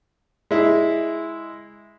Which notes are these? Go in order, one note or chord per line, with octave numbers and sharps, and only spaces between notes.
G#3 E4